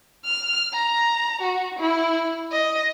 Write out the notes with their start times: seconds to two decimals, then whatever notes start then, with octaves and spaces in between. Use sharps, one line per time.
0.24 F6
0.73 A#5
1.41 F#4
1.79 E4
2.52 D#5